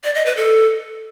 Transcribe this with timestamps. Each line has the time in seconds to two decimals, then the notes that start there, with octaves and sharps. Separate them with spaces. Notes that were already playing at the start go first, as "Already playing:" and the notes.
0.04 D5
0.15 D#5
0.26 B4
0.37 A4